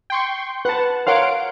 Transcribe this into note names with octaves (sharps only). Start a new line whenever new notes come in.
G5 C6 C#6
B4 F#5 A5
A#4 C#5 F5 F#5 C6 D7